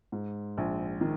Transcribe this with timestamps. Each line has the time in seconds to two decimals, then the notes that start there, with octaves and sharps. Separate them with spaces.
0.12 G#2
0.58 A#1
1.01 D#3